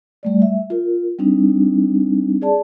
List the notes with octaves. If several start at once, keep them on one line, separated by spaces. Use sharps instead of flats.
G3 A3 D5
E5
F4 A#4
G3 C4 D4 D#4
G#4 D5 A5